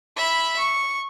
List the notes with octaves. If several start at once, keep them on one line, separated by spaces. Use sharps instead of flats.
E5 B5
C#6